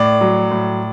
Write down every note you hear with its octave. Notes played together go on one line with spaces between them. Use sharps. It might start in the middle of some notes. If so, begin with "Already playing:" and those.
Already playing: A2 D5
F#3
A2